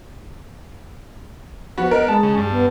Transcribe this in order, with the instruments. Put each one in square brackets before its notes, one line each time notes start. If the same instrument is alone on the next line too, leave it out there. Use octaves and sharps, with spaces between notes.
[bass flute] F3 [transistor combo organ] B3 [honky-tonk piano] F#4
[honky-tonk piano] A#4 [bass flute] D#5
[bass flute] G#3 [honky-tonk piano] A5
[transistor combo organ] C#3
G2
[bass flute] B3